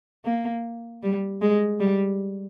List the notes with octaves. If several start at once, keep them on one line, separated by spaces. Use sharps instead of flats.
A#3
G3
G#3
G3